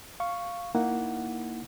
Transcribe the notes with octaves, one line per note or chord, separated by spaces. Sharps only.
F5 C#6
A#3 D#4 E4 F#5